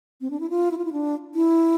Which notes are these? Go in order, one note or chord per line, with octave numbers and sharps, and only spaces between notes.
C4
D4
E4
F4
E4
F4
E4
D4
E4